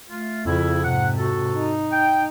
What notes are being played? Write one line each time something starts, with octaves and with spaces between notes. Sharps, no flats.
A3 F4
F2 C#3 E4
G#2 C3 F#5
F#4 A4
D#4
G5